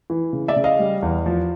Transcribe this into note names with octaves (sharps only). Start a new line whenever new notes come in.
E3
C#3
D5 E5
C#3
D#5 F5
G3
E2
F3